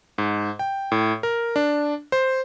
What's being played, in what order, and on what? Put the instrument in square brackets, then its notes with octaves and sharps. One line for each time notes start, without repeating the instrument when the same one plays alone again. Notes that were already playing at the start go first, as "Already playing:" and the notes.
[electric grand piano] G#2
G5
A2
A#4
D4
C5